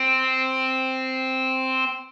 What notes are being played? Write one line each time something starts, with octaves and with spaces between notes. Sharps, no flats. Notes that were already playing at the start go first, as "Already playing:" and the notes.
Already playing: C4